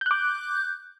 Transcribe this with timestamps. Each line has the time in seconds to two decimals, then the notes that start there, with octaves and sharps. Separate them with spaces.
0.01 G6
0.06 F#6
0.11 D6